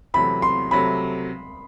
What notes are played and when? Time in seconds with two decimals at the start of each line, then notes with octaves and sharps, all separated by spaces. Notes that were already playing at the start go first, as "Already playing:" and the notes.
0.14 E2 C3 F#3 A3 B5
0.42 C6
0.71 C3 F#3 A3 B5